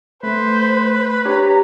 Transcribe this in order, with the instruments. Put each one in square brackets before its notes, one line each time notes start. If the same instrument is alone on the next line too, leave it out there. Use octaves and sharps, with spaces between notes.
[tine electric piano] A3 [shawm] B4 [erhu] C5
[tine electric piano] D4 G4 C#5 [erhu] A#5